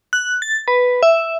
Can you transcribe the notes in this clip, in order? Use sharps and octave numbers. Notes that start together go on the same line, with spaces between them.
F#6
A6
B4
E5